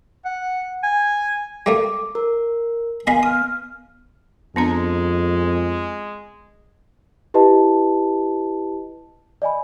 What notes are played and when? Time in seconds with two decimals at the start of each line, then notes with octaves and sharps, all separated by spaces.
0.25 F#5
0.83 G#5
1.66 G3 A3 A#3 D6
2.15 A#4
3.07 B3 A#4 D#5 F5 G#5 B5
3.23 D#6 F6
4.56 F2 G#3 B3 D4 A#5
7.34 E4 G4 B4 D#5 A5
9.42 D5 D#5 G#5 B5